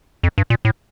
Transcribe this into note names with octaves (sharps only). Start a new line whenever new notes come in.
F2
G2
A#2
A2